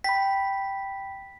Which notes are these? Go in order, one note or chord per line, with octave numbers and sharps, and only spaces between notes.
G5 B5 B6